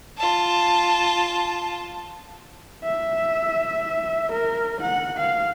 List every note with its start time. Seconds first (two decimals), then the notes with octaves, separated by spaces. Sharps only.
0.18 F4 A5
2.84 E5
4.32 A#4
4.81 F#5
5.17 F5